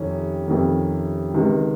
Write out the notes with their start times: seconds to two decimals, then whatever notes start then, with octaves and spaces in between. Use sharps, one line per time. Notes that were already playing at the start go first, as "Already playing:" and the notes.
Already playing: F2 C3 D#3 C#4
0.47 F2 C3 D#3
1.34 C#2 C3 D#3